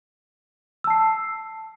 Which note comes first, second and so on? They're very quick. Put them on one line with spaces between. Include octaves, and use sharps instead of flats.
E6 A5 C7